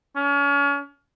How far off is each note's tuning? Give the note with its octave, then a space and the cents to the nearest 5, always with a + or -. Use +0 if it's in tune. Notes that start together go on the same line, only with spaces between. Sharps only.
C#4 +35